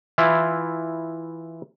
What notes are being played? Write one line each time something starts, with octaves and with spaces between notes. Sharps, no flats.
E3 E4 F4